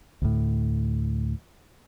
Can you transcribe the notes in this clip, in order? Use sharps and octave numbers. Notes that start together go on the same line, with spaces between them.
D2 A2